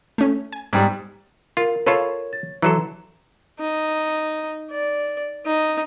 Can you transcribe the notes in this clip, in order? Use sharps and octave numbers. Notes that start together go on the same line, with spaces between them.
A3 C#4
G#5
G#2 G3
F4 A#4
F4 A4 B4 C#5
A6
E3 F#3 A4 A#5 C6
D#4
D5
D#4